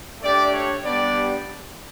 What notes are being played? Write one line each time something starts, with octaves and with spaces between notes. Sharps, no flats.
A3 D4 G4 D5
C#5
G3 B3 D4 G4 D5